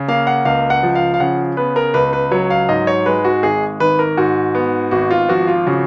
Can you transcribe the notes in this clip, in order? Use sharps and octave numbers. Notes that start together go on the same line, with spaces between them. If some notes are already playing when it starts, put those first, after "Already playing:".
Already playing: C#3
A#3 F5
F#5
C#2 F5
F#5
F3
F5
F5
C#3 F#5
B3 B4
A#4
C#2 B4
B4
F#3 C#5
F5
G#2 D#5
C#5
G#3 B4
F#4
G#1 G#4
D#3 B4
A#4
G#2 F#4
B3
G#1 F#4
F4
F3 F#4
F4
C#3 F#4